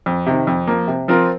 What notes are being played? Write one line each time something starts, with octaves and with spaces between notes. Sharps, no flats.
F2
C3 D#3
F2
F3 A#3
C3
F3 C4 F4 A#4